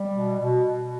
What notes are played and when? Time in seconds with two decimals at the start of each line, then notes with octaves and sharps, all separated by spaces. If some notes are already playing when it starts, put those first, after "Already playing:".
Already playing: G3
0.13 B2
0.40 B2
0.67 B2